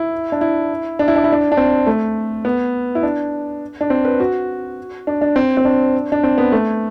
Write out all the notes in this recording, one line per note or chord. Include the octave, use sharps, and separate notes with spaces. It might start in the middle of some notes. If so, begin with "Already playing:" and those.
Already playing: E4
D4
E4
D4
E4
D4
E4
D4
D4
C4
A3
B3
E4
D4
D4
C4
B4
F#4
D4
D4
C4
C4
D4
D4
C4
B3
A3